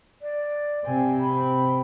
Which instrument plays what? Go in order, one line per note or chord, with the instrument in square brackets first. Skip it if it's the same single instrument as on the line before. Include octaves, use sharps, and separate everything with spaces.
[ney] D5
[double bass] C3 C4 [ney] G#5
[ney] B5